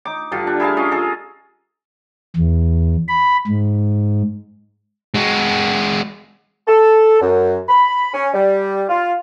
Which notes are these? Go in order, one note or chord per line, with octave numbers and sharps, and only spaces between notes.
D#4 D6
G2 D3 F4
D4
E4 G#4 A#4 F5
C#4 F4 D#5
G#4 A4 D#5
E2
B5
G#2
G#3 F#4
A4
F#2
B5
C#4
G3
F4